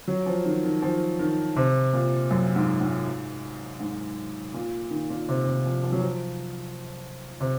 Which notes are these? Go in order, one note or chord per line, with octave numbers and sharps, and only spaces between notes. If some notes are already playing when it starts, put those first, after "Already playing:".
F#3
F3
D#3
D#3
F3
D#3
C3
A#2
F#2
G#2
G#2
G#2
A#2
D#3
A#2
C3
C3
F3
F3
F#3
F3
C3